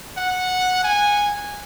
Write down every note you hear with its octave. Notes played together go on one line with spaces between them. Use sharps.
F#5
G#5